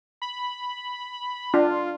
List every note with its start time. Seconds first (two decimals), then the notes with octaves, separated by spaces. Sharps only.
0.22 B5
1.54 D4 F4